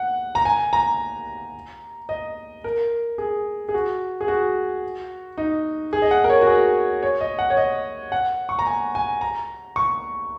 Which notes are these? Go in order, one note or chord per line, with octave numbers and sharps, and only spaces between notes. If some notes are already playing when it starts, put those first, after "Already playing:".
Already playing: F#5
A#5
G#5
A#5
D#5
A#4
G#4
G#4
F#4
G#4
F#4
D#4
G#4
D#5
F#5
A#4
C#5
F#4
G#4
C#5
D#5
F#5
C#5
D#5
F#5
C#6
A#5
G#5
G#5
A#5
C#6